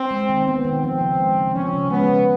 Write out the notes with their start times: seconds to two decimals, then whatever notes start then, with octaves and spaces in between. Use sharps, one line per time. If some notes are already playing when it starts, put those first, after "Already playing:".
Already playing: C4
0.11 G#3
0.29 D#3
0.47 B3 C4
0.65 D#3
0.84 F3 C4
1.01 C#3
1.19 G#3
1.37 C#3
1.54 F3 C#4
1.74 C#3
1.90 G#3 B3
2.09 C#3